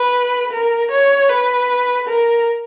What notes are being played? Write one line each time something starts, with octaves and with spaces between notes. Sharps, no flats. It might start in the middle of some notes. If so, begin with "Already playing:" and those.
Already playing: B4
A#4
C#5
B4
A#4